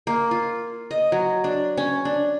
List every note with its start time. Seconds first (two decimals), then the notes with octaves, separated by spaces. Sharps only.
0.07 A#3
0.31 F4
0.91 D#5
1.12 F#3
1.44 D4
1.77 C#4
2.05 D4